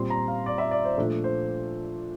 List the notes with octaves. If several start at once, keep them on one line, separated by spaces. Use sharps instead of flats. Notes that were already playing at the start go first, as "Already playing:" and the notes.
Already playing: A#2 G3 C4 C6
A#5
F5
D5
E5
D5
C5
A#2 F3 A3 D4
C5